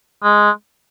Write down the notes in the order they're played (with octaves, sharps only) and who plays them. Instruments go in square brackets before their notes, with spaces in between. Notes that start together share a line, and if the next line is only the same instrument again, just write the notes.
[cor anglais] G#3